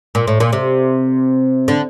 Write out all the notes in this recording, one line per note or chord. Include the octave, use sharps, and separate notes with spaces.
A#2
A2
A#2
C3
D3